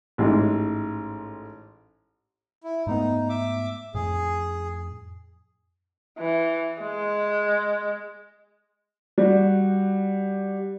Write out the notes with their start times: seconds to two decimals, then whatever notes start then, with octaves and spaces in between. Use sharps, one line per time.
0.18 A1 G#2
2.64 E4
2.87 G#2 A3 B3 D#4
3.29 E5 D6
3.94 F2 A2 G#4
6.19 E3
6.82 G#3
9.18 G3 F#4